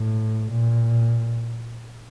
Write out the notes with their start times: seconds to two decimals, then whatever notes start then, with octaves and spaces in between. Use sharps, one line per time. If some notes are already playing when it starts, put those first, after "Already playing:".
Already playing: A2
0.52 A#2